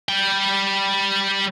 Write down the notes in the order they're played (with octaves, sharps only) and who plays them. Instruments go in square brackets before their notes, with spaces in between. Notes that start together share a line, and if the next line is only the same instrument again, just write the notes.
[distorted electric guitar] G3 G5